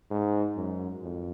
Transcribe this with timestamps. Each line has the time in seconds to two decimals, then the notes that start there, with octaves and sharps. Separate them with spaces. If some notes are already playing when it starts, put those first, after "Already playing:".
0.11 G#2
0.56 F#2
1.02 F2